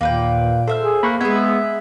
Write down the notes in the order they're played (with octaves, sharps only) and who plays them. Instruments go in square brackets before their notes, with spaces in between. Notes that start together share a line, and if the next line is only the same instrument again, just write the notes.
[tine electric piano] D#2 [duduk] A#2 [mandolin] A#3 B4 G5
[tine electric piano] A4 [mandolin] C5 E5 F6
[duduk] G#4
[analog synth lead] A#3 [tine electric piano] B5 C#6 F#6
[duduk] G#3 [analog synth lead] B3 [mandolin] G#4 E5 [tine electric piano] G#6